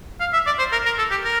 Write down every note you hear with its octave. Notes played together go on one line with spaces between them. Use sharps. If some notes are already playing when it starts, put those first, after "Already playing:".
F5
E5
D5
C5
A#4
A#4
A4
G4
A#4